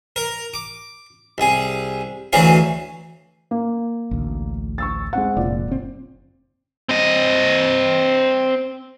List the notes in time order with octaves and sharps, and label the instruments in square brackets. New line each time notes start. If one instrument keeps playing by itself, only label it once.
[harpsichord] A#4
D6
C2 G#4
D2 E3 F#3 G#4 F5
[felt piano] A#3
[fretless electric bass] A1 D2
[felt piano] C#6 E6 A6
G#3 C4 F#5
[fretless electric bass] F1 [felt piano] A#2 D5
[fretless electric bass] F#1 C4
[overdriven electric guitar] C4 D#5